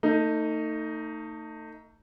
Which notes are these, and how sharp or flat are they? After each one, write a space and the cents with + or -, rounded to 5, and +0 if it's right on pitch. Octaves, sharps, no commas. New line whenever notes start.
A3 +35 D#4 +0